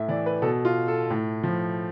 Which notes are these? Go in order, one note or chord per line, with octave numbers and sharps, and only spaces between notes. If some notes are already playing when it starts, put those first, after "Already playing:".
Already playing: A2 E5
E3 D5
B4
B2 A4
F4
A4
A2
F3